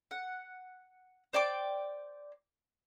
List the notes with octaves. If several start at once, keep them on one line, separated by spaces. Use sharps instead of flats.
F#5
C5 D5 G5 D6